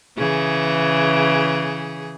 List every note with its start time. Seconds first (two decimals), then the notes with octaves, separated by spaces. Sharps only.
0.17 C#3 E3 G#4